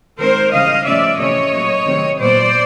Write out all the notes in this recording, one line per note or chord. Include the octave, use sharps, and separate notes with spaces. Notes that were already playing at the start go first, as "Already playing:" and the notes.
D#3 G#3 C4 A#4 C5
C#3 E3 G3 D#5 F5
C#3 F3 A3 C#4 D5 E5
C3 E3 A3 C#4 C#5 D#5
A#2 F#3 A3
C3 D#3 F#3 A3 C4
A#2 F#3 B3 C5 D5